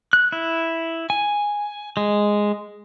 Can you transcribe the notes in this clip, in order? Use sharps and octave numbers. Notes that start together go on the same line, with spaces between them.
F#6
E4
G#5
G#3